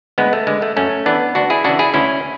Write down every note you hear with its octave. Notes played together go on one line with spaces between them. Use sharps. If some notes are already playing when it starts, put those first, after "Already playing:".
D2 G#3 B3
A3
D3 G#3
A3
F#2 A3 C#4
E3 B3 D4
D2 D4 F#4
E4 G#4
C#3 E3 D4 F#4
E4 G#4
D2 C#4 E4